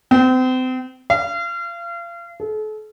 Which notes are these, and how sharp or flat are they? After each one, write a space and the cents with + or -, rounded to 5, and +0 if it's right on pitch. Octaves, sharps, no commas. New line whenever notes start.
C4 -35
F5 -35
A4 -40